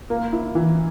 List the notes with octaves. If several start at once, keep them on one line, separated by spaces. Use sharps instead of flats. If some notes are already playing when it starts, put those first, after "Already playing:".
A#3
E4
E3